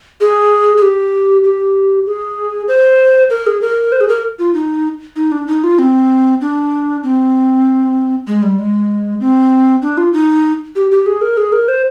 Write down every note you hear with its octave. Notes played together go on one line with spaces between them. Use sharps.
G#4
G#4
G4
G4
G#4
C5
A#4
G#4
A#4
C5
G#4
A#4
F4
D#4
D#4
D4
D#4
F4
C4
D4
C4
G#3
G3
G#3
C4
D4
F4
D#4
G4
G4
G#4
A#4
G#4
A#4
C5